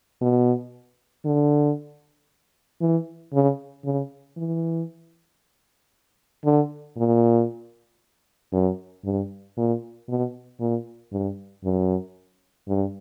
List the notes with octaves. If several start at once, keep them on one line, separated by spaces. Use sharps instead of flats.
B2
D3
E3
C#3
C#3
E3
D3
A#2
F#2
G2
A#2
B2
A#2
G2
F#2
G2